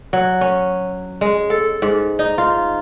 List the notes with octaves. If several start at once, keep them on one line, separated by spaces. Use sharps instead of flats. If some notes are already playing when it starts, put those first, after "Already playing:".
F#3
C#4
G#3
A4
G#2
D#4
F4